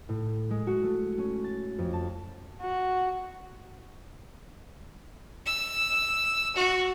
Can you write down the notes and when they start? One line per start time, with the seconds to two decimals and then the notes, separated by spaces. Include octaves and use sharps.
0.09 A2
0.50 G#3
0.67 F#4
0.83 A3
1.18 C#4
1.44 A6
1.78 F2
1.93 A5
2.61 F#4
5.46 E6
6.55 F#4